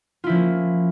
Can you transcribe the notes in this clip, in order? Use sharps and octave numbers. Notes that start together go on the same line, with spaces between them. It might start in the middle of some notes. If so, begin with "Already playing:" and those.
F3 A#3 C#4 E4 F4